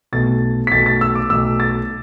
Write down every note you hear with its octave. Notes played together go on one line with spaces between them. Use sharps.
B1 B2 A3 A6
B6
B1 B2 A3 A6
A6
E6
D6
B1 B2 A3 E6
A6